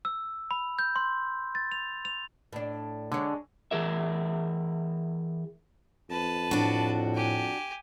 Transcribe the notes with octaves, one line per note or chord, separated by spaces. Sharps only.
E6
B5
G6
C6
A6
F7
F7
A2 D4
D3 G#3 D4 C#5
E3 G#4 A#4 E5
F2 B4 A5
A2 D4 F#4
G4 G#5